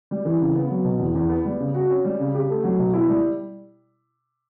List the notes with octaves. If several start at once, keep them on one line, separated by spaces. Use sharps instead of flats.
G3
E3
C#3
B3
F#3
B2
E2
E2
B3
G3
C#3
F#4
C#4
G3
C#3
G4
A3
F#3
B2
E4
G3